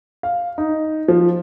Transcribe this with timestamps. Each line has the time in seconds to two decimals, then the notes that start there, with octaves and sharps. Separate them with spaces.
0.23 F5
0.58 D#4
1.08 F3